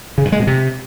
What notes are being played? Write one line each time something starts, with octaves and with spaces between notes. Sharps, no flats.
C#3
G2
G#3
B2
C3